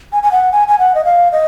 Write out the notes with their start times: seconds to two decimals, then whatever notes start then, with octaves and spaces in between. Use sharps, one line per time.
0.13 G#5
0.23 G#5
0.32 F#5
0.52 G#5
0.68 G#5
0.79 F#5
0.95 D#5
1.05 F5
1.32 D#5